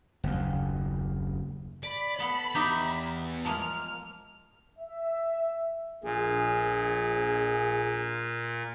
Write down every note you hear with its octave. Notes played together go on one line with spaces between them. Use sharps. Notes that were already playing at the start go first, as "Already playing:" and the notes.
F#1 D#2
D5 B5
B3 A4
E2 D#4 G4 E5
F3 G#3 A#3 F6
E5
A#1 A#2 G#4